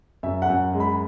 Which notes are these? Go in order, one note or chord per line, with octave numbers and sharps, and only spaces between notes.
F#2 E5
F#5
F#2
G#3
B5